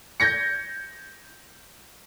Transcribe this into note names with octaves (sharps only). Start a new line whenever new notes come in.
G6 G#6 A#6 C#7